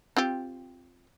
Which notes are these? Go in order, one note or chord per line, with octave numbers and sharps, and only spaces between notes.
C4 F4 G4